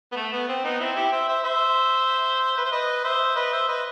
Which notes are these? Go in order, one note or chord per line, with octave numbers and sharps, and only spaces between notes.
B3
A3
B3
C4
B3 D#4
C4 E4
E4 G4
C5 E5
C5 E5
C5 E5
B4
C5
B4 D#5
C5 E5
B4 D#5
C5 E5
B4 D#5